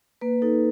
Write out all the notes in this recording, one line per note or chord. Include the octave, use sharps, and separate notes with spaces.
A#3 B4
D#4 A4